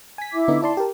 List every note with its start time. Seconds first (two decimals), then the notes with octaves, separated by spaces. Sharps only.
0.18 G#5 B6
0.33 E4 E5 D6
0.48 D3 B3 D#4
0.62 E4 D5 A5 C6
0.77 G4 A#4